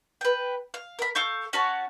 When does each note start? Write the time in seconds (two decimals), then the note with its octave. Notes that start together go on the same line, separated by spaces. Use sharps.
0.21 B4 G5
0.74 F5
0.99 A#4 B5
1.15 A4 F5 C#6 G6
1.53 C#4 F#4 C#5 A5